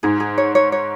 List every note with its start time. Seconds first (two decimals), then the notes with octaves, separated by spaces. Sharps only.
0.03 G#2 G#4
0.20 G#4
0.38 C#5
0.55 C#5
0.72 C#5